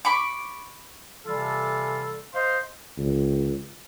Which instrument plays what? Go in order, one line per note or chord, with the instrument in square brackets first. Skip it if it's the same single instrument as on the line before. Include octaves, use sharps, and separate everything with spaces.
[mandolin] B5 C#6 D6
[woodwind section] C3 E3 G3 F4 A4
C5 D#5 F5 C6
[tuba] C#2